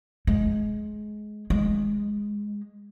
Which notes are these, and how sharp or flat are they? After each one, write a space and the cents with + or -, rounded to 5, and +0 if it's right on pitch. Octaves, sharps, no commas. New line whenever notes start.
G#3 +25
G#3 -10